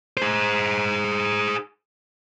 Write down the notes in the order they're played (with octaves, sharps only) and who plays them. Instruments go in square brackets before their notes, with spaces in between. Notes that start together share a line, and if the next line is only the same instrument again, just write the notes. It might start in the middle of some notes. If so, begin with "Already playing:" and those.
[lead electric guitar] G#4 C5